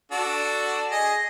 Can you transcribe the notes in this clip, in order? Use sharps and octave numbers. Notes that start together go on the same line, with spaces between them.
D4 F#4 A4
G#4 D#5